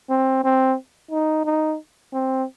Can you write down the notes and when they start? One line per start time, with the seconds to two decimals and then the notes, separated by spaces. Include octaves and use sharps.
0.09 C4
0.44 C4
1.11 D#4
1.45 D#4
2.13 C4